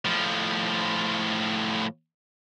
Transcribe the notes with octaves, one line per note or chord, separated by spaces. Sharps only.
A2 F3